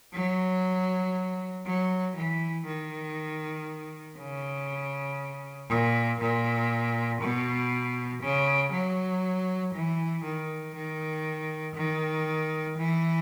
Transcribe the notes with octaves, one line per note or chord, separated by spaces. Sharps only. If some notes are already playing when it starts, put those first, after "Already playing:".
F#3
F#3
E3
D#3
C#3
A#2
A#2
B2
C#3
F#3
E3
D#3
D#3
D#3
E3